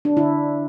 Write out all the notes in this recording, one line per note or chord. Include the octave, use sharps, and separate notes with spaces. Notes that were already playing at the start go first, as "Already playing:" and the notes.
D4
D3 E4